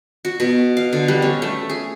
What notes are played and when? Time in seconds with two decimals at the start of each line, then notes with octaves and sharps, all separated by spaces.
0.25 F#4
0.40 B2
0.77 F5
0.93 D3
1.08 G3
1.22 C#4
1.42 A3
1.70 G#4